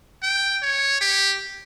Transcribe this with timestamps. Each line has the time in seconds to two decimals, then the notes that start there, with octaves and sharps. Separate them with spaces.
0.23 G5
0.62 C#5
1.01 G4